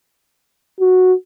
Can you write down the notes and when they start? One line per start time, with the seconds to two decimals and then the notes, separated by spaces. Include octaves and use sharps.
0.80 F#4